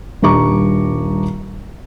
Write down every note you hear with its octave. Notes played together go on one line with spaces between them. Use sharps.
D#1 G3 D4 A#5 C#6 D6